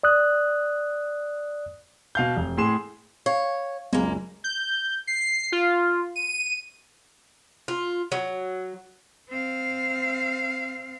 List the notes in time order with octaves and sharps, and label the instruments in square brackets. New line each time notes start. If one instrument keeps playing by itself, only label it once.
[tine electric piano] D5 D#6 F#6
[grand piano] B2 F5 G6
F1
A2 G#4 C6 E7
[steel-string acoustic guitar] C#5 [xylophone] F5
[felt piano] F#1 C#2 [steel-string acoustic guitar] G#3 A#3
[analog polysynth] G6
C7
F4
D#7
[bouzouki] F4
F#3
[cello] C4 F5